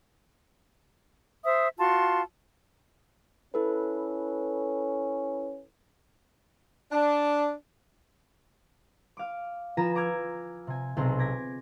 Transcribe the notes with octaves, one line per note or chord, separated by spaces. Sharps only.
C5 E5 D#6
F4 F#4 A5 C6
C#4 E4 A4 B4
D4
F5 D6
F3 F4 B4 G#5 A#5 E7
A#5 D6 E6 F6 G#6
C3 G#5
B1 C3 G#4 A#6
D6 G#6 A#6 B6